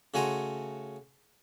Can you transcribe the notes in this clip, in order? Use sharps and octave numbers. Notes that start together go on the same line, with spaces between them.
C#3 A3 F#4 G#5 A#5 C6